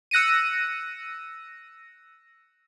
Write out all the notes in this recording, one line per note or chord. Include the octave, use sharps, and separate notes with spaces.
E6 F#6 A#6 C#7 D#7